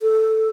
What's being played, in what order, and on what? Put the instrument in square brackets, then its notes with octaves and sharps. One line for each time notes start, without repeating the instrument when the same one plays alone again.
[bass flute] A4